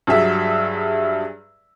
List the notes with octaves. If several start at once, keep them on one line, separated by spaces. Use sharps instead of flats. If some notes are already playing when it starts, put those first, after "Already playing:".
G2 F#3 G#4 E5